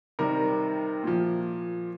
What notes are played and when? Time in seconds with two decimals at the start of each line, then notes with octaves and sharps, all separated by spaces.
0.19 C3 D#3 G3 A#4
1.03 A#2 F3